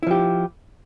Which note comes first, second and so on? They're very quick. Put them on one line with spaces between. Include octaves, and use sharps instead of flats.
E4 F3 G4